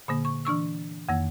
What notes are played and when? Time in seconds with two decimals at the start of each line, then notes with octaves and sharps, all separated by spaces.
0.08 A#2 D3 A#3
0.25 C#6
0.45 E3 D4 C#6 E6
1.09 F2 D#3 A#3